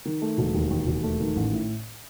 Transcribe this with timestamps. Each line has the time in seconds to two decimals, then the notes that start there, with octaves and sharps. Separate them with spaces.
0.05 D#3
0.22 A3
0.38 E1
0.54 D#2
0.70 D#2
0.87 E1
1.03 A3
1.20 D#3
1.36 A1
1.52 A2